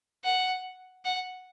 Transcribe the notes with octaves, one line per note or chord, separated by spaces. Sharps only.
F#5
F#5